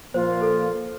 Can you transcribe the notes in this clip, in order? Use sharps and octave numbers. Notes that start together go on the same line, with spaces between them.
A#2 F3 A#3 F4 C5
A4